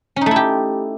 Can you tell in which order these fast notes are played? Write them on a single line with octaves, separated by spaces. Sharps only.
C#4 D#4 A3 E4 G4